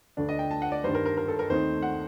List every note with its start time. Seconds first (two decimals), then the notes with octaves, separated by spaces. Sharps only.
0.17 D2 D3 A3 D4
0.29 D#5
0.39 G5
0.51 A5
0.62 F#5
0.72 D5
0.84 G2 D#3 G3 D4 C5
0.95 A#4
1.06 A#4
1.17 A#4
1.28 A4
1.39 A#4
1.49 D#2 D#3 A3 C4 D#4 C5
1.83 F#5